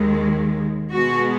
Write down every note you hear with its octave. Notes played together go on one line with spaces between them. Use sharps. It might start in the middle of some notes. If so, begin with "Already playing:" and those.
Already playing: D#2 D#3 G#3
B2 G#3 B3 F#4